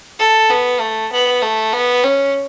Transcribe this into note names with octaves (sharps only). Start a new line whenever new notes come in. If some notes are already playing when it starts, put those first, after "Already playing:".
A4
B3
A3
B3
A3
B3
C#4